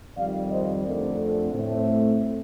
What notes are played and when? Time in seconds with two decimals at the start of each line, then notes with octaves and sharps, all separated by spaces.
0.17 F2 D#3 G3 D5 F5
0.51 C5 D#5
0.84 F2 D3 A3 C4 A#4 D5
1.52 A2 A3 C4